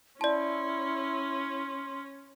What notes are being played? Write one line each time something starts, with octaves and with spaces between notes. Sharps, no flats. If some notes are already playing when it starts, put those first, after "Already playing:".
C#4 E4 D5 A5 C6